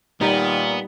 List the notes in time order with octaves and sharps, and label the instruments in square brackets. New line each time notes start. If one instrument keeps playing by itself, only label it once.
[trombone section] A#2 [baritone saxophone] D#3 [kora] G3 D#4 [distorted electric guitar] B3